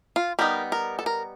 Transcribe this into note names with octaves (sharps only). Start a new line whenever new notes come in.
F4
G3 B3 D#4 A#4
A#4
A4
A#4